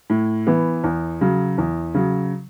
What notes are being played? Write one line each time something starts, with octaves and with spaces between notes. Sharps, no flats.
A2
E3 B3
E2
C#3 F#3
E2
C#3 F#3